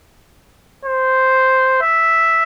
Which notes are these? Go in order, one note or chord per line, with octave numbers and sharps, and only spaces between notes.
C5
E5